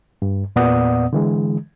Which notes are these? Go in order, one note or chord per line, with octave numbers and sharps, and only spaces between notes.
G2
E2 A#2 B3 D5 F#5 D#6
D3 E3 G#3